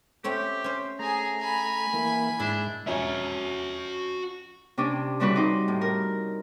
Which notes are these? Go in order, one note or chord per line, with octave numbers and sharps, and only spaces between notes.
A3 C4 C#4 G4
C#4 C5
A3 G#4 G#5 A#5
G#5 B5
E3 A#3
G#2 D4 E4
F2 C#4 F#4 E5 G#5
C3 C#4 D4
C#3 E3 G3 C4 F#4 B4
D#4 C5
A2
A#4